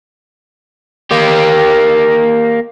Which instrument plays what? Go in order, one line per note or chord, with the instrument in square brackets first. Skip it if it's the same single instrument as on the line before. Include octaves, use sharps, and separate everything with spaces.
[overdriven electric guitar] A#3 G4